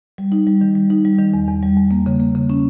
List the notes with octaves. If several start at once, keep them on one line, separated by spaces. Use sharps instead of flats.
G3
D#4
G3
D#3
G3
D#4
G3
D#3
E2
E2
G3
E2
A#3
C#3
A#3
C#3
C#4